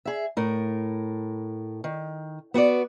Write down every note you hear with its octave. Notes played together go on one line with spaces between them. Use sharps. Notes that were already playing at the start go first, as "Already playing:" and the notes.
G#4 E5
A2 A#4
D#3
B3 F#4 B4 D5